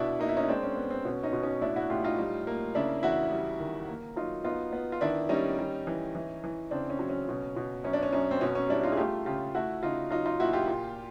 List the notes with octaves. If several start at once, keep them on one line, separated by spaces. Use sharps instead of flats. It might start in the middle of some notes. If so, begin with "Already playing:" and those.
Already playing: B2 D4 E4
A#3 D#4
E4
C#4 D#4
G#3 C4 D4
C#4
B3
C4
B2 C#4
C#4 D#4
B2
C#4 D#4
A2 D4 E4
E4 F#4
A2 F4 G4
D#4 F4
G3
A#3
C#3 D4 E4
E2 E4 F#4
G3
D#3
A#3
F#3 D#4 F4
B3 D#4 F4
B3
F4
D#3 D4 E4
G3 C#4 D#4
G3
E3
E3
E3
C#3 C4 D4
C#4
F#3
C#4
B2
B2
F#2 C#4
D4
C#4
F#2 C#4
C4
B2 C#4
C#4
G3 D4 E4
D#4 F4
G#4
A3 F4 G4
C#3 F4 G4
A3 E4 F#4
C#3 D#4 F4
F#3 D#4 F4
D#4 F4
A#2 E4 F#4
F4 G4
A#2